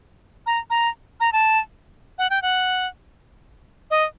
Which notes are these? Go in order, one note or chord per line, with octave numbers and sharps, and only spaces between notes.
A#5
A#5
A#5
A5
F#5
G5
F#5
D#5